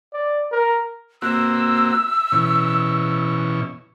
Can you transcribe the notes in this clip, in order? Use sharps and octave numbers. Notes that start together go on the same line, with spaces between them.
D5
A#4
A#3 C4 F#4 E6
B2 E3 C#4